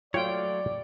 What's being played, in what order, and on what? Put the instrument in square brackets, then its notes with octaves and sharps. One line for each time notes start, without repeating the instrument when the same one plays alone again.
[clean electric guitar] F#3 G#3 A3 [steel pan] F4 G5 [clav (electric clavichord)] C#5 [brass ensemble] D5